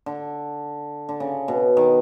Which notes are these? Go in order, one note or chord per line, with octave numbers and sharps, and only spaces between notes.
D3
D3
C#3
B2
D#3